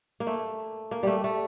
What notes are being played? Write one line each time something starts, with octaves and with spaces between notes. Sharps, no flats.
A#3
A3
A#3
G3 A3
A3